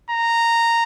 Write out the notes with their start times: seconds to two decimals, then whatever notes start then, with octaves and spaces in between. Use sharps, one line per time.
0.11 A#5